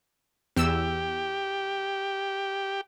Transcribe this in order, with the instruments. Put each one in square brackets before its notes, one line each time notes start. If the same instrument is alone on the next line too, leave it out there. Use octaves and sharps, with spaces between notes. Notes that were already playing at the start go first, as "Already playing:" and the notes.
[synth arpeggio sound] E2 E6 [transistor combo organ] G4